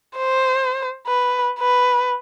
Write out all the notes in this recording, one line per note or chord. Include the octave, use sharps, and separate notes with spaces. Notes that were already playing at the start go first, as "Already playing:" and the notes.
C5
B4
B4